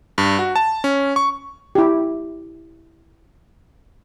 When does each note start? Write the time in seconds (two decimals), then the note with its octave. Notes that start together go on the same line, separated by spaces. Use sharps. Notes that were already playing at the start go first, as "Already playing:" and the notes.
0.18 G2
0.39 F#4
0.56 A5
0.84 C#4
1.16 C#6
1.75 E4 G4